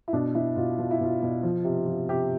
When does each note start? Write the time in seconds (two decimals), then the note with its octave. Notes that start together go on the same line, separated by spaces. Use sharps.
0.08 E4
0.13 B2 D4
0.35 B2 E4
0.56 B2 F4
0.78 B2 F4
0.91 E4
1.00 B2 F4
1.22 B2
1.43 F3
1.64 C3
1.86 F3
2.09 C3 G4